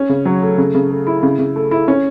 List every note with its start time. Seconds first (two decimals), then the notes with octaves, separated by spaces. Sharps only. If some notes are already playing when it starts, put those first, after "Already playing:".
Already playing: C#4
0.09 C#3
0.25 F#3
0.42 A3
0.58 C#3
0.75 C#3
0.90 A3
1.07 E4
1.23 C#3
1.39 C#3
1.56 A3
1.71 E4
1.88 C#4